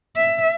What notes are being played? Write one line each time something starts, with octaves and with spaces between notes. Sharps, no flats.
E5